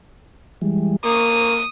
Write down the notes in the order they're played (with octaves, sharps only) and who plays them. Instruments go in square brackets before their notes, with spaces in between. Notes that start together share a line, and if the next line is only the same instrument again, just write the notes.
[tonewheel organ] E3 G3 G#3
[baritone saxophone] A#3 [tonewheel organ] C#6 [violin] D#6